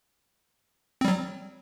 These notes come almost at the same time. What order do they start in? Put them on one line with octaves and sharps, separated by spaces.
C4 G3 F#3